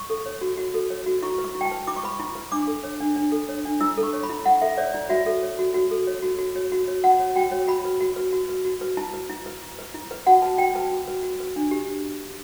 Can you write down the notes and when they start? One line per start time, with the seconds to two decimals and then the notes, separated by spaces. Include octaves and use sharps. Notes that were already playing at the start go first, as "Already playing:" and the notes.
Already playing: C#6
0.10 A4
0.26 C#5
0.41 F#4
0.58 F#4
0.74 A4
0.90 C#5
1.06 F#4
1.22 E4 C#6
1.38 B4
1.44 C#6
1.55 E4
1.61 G5
1.65 A5
1.72 B4
1.87 E4 D6
1.96 C#6
2.03 B4 B5
2.13 C#6
2.20 E4
2.35 B4
2.52 D4 D6
2.67 A4
2.84 C#5
3.00 D4
3.16 D4
3.32 A4
3.49 C#5
3.65 D4
3.81 E4 E6
3.97 A4
4.03 C#6
4.13 C#5
4.23 B5
4.30 E4
4.46 E4 F#5
4.62 A4 E5
4.78 C#5 D5
4.93 E4 D5
5.09 F#4 E5
5.26 A4
5.43 C#5
5.59 F#4
5.74 F#4
5.91 A4
6.07 C#5
6.22 F#4
6.39 F#4
6.56 C#5
6.72 F#4
6.88 C#5
7.04 F#4 F#5
7.20 C#5
7.36 F#4 G5
7.52 C#5
7.68 F#4 B5
7.85 B4
8.01 F#4
8.16 B4
8.32 F#4
8.49 B4
8.65 F#4
8.81 B4
8.97 E4 A5
9.14 B4
9.30 E4
9.46 B4
9.62 E4
9.79 B4
9.94 E4
10.11 B4
10.27 F#4 F#5
10.42 B4 A5
10.58 F#4 G5
10.75 B4 A5
10.91 F#4
11.07 B4
11.23 F#4
11.40 B4
11.56 D4
11.71 G4